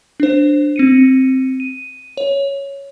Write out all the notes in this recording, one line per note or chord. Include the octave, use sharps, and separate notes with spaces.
D4 C5
C4 C#7 D#7
D#7
C#5